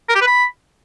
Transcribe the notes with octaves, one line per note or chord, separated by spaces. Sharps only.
A#4
G4
B4
B5